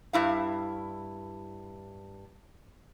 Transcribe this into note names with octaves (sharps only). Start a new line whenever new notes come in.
G2 E4 F5